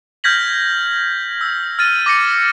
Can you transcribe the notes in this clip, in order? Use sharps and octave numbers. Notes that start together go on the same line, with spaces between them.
F6 G6 G#6 A#6 B6 F#7
E6
F6 A6 D#7
D6 A#6 C#7